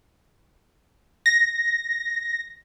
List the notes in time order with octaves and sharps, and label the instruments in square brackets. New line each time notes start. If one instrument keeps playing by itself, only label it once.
[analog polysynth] A#6